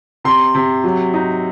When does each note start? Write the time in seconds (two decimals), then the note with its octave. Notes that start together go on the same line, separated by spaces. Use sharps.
0.24 C3 C6
0.55 C3
0.84 F#3
1.14 D#4